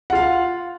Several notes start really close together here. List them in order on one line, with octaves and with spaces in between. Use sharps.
F#5 F4 F5